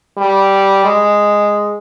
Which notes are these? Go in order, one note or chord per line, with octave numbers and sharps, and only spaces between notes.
G3
G#3